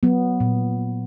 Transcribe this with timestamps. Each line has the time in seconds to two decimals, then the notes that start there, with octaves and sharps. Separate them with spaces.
0.03 F#3 B3
0.40 A#2